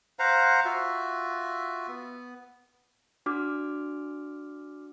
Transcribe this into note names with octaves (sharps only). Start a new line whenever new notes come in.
C5 F5 F#5 A#5
F4 F#4 E5
B3
D4 F#4 D6 F6